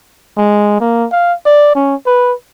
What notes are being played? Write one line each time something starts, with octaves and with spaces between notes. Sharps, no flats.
G#3
A#3
F5
D5
C#4
B4